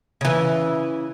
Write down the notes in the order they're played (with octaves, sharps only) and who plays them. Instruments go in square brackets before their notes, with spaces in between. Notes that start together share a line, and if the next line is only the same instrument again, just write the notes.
[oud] C#3 E3